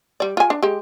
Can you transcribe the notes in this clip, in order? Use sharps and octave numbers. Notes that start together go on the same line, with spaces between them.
G3 D5
F4 G#5
D4
G#3 G4